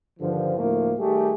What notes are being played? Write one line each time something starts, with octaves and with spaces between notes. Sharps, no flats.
G2 D3 D#3 F3
D2 A2 F3 A3 A#3
D#3 G3 A3 G4 G#4